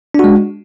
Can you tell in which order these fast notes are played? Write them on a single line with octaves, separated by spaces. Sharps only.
D4 F#4 G#3